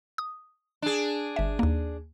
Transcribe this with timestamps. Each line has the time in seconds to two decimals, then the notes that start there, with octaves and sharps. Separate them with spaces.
0.18 D#6
0.82 D4 G#4
1.36 G1 E5
1.59 D#2 A#3